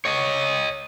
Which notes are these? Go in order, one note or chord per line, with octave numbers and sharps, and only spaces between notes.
C#5 D#5